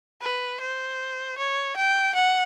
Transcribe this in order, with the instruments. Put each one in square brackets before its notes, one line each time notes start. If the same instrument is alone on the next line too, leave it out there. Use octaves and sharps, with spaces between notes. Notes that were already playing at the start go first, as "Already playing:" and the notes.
[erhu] B4
C5
C#5
G5
F#5